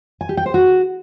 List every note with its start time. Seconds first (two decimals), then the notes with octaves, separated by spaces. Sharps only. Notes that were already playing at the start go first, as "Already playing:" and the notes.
0.21 G#5
0.29 G4
0.37 G5
0.46 C5
0.54 F#4